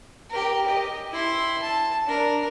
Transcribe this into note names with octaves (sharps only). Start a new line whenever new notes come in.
G4 A#4
G4 D#5
E4 C6
A5
D4 A#4